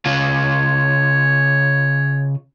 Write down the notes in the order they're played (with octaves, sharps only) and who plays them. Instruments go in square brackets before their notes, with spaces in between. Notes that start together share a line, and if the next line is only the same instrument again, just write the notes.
[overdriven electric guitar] C#3 F4 [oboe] C#5